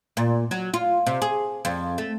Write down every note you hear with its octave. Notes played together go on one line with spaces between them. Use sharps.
A#2
F#3
F4
C3
G#4
F2
A3